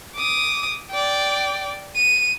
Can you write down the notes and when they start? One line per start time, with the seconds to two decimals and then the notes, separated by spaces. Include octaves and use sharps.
0.16 D6 D#6
0.91 D5 G5
1.96 D#7